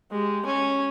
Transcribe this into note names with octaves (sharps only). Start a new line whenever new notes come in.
G#3 G4
C#4 G#5